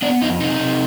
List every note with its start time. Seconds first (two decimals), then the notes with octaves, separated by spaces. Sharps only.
0.02 B3 D4 D5
0.21 F2 D#4 D#5
0.40 C3 D#4 D#5
0.60 C3